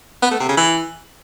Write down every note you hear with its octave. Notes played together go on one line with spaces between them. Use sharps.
B3
A3
C3
C#3
E3